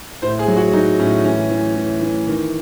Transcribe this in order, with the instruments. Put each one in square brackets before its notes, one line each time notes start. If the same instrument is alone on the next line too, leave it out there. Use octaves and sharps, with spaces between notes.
[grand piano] A2 C5
G#4
F#3
F#4
F#3 D#4
A2 C#4
E3 C#4
E3
E3
E3
D#3